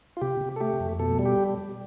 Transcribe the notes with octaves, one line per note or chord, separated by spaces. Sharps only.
F4
C3 G4
C3
A4
A3 G4
F2
B2 A4
G3
G4